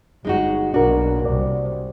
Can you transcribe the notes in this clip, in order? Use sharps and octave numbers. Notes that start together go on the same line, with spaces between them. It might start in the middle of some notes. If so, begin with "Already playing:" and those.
G1 G#3 D#4 F#4
B1 A#3 D4 F#4 A#4
C2 D5